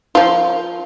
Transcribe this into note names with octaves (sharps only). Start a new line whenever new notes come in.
F3 F4